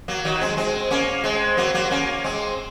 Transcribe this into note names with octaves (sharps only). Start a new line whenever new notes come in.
F#3 A#3
D#3 F#3
G#3 C4
G#3 C4
A#3 C#4
G#3 C4
F#3 A#3
F#3 A#3
A#3 C#4
G#3 C4